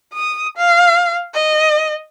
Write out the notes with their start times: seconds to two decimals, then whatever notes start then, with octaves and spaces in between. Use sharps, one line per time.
0.13 D#6
0.57 F5
1.34 D#5